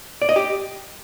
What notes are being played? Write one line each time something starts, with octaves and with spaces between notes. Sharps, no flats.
D5
D#5
G4